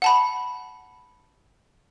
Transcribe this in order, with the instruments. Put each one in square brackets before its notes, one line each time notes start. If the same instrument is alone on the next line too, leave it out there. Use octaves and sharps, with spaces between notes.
[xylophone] F#5 A5 B5